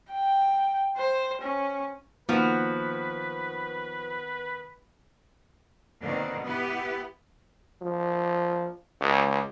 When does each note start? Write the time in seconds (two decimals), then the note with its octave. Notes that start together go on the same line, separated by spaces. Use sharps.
0.12 G5
0.97 C5
1.42 C#4
2.29 D#3 F3 A#3 B3 F#4 B4
6.01 B2 D3 D#3 A#3 C4
6.45 B3 E4 G4 B4
7.82 F3
9.01 C#2